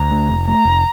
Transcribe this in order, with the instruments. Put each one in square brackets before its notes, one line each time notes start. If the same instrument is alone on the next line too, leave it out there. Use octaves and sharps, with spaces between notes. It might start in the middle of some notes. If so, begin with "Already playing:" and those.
Already playing: [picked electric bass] D2 [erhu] A#5
[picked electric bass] A3
F1
[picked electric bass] A3 [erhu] A#5
[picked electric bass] F1